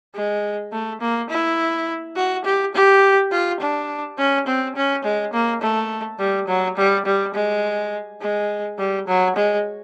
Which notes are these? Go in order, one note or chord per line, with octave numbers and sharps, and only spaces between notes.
G#3
A3
A#3
E4
F#4
G4
G4
F4
D4
C#4
C4
C#4
G#3
A#3
A3
G3
F#3
G3
G3
G#3
G#3
G3
F#3
G#3